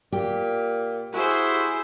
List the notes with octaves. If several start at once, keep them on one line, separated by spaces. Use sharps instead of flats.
A#2 G4
E4 F#4 G#4 C5